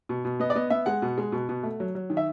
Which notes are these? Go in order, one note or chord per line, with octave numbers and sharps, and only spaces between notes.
B2
B2
B3 D#5
D5
B3 D#5
B3 E5
G#3 F#5
B2
G#3
B2
B2
A3
F#3
F#3
D#3
E5